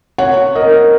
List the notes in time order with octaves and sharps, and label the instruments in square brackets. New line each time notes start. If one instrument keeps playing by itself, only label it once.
[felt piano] C#5 F#5
A#4 D#5